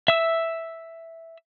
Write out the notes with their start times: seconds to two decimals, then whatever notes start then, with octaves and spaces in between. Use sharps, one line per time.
0.08 E5 E6